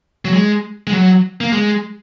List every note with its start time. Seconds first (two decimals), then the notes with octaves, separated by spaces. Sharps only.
0.25 F#3
0.33 G#3
0.87 G#3
0.92 F#3
1.41 A#3
1.53 G#3